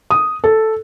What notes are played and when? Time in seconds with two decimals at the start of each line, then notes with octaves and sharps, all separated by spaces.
0.11 D#6
0.44 A4